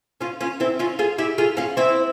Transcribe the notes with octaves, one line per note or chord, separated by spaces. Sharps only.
C#4 F4
C#4 F4
C4 E4
C#4 F4
F4 G#4
E4 G4
F4 G#4
C#4 F4
C4 E4